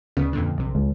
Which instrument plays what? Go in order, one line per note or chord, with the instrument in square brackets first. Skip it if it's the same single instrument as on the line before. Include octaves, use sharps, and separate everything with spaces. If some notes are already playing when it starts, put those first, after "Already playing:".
[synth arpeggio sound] D2 C#3 B3
F2 A#2 D3
B1 C3
[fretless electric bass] C#2